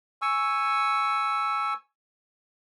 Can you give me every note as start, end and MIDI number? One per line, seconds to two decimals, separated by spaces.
0.22 1.74 80
0.22 1.74 85
0.22 1.74 88